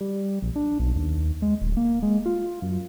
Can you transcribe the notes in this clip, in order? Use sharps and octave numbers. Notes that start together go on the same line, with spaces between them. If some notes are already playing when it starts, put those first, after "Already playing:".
G3
A#1
D4
B1
D#2
G#3
D1
A#3
G#3
F4
F#2